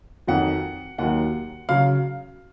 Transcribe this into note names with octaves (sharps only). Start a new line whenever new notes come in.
F2 D#3 F#3 F#5
D#2 D#3 F#3 F#5
C#3 F#3 F5